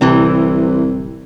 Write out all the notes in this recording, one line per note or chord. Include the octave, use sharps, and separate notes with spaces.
D1 C2 C3 E3